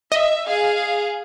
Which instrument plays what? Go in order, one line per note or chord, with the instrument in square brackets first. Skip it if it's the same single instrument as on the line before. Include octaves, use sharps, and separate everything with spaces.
[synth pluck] D#5 [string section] E5
[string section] G#4 F5